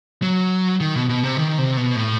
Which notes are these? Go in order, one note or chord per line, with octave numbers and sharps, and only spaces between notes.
F#3
D#3
B2
B2
C3
D#3
C3
B2
A2